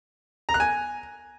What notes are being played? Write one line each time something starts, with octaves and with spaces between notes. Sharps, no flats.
A#5
F#6
G#5